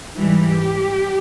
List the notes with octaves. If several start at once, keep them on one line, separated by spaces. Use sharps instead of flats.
G#2 E3 G3 G4